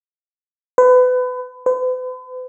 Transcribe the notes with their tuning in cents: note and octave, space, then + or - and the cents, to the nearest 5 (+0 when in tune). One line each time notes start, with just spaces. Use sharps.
B4 +30
B4 +45